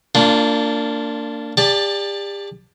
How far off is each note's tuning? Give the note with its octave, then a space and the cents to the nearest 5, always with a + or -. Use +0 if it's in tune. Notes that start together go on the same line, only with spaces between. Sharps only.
A#3 -30 D4 -5 F4 +0
G4 +40 D5 +0 A5 +10